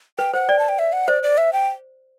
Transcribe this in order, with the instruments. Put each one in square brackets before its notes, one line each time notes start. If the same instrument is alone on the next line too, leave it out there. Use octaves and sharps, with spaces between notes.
[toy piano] B4 [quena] G5
[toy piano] C5 [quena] F#5
[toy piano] D5 [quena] G5
[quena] A5
G5
E5
F#5
[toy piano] C5 [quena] D5
[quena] D5
E5
G5